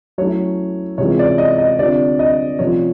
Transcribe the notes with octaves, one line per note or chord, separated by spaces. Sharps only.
F#3 A3 C#4 E4 C#5
C3 E3 G#3 C#4 F4 C#5
D5
D#5
D#5
D3 G3 C4 F4 D5
D#5
C3 F3 A3 C#4 F4 C#5